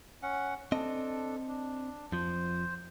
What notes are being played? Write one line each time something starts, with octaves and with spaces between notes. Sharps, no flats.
C#4 F#5
C4 D4 A4 D#5
D4
F2 F3 C5